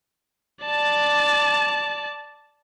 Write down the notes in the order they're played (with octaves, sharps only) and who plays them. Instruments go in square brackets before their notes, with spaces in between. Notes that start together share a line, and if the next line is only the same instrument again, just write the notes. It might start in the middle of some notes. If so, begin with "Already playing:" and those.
[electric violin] D5 A5